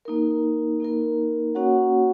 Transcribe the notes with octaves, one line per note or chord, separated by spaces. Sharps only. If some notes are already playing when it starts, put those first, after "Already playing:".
A#3 D#4 A#4
A#3 D#4 A#4
A#3 C#4 F#4 C#5 F#5